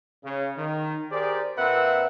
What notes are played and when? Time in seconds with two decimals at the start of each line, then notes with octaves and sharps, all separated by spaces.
0.24 C#3
0.57 D#3
1.11 G4 G#4 A#4 C5 D5
1.58 A#2 C4 A#4 B4 E5 F#5